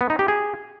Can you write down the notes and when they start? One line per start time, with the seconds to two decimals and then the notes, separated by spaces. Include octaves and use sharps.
0.01 B3
0.10 D#4
0.19 G4
0.28 G#4